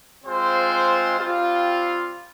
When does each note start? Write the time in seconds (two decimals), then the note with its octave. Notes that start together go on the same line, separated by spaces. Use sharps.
0.24 G#3 C4 F4 C5
1.17 G3 C4 F4